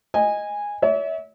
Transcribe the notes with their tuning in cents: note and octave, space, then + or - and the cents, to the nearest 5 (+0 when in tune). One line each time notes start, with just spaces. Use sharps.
D#5 +0 G#5 -15
C#5 +40 E5 -30